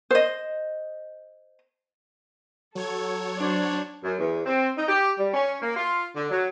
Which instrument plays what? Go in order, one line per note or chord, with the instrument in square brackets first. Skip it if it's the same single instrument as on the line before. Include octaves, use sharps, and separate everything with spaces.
[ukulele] C5 D#5
[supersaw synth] F#3 C#5 G#6 [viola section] A4
[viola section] D4 C5 D5
[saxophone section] F#2
E2
C4
D#4
G4
G3
C#4
A#3
F4
D3
F#3